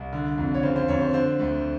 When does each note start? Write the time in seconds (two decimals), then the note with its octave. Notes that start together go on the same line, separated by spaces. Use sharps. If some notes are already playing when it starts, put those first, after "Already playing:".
Already playing: C2
0.13 D3
0.38 F2
0.54 C#5
0.63 C#3 C5
0.76 C5
0.88 F2 C#5
1.01 C5
1.13 D3 C5
1.39 D2